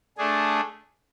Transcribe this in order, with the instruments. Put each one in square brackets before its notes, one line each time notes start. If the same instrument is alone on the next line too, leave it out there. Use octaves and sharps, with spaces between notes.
[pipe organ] A3 D4 G#4